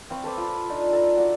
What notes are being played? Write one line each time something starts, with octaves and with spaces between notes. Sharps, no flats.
C4 F5 B5 C#6
A4 B4 C5 D6
F4 B5
D4 D#4 F4
A4 A#5
F#4 D5 E5